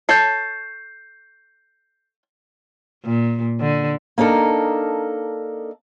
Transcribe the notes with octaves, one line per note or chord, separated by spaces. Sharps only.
A4 C#5 G6 C7
A#2
D3
A#3 D4 D#4 A4 A#4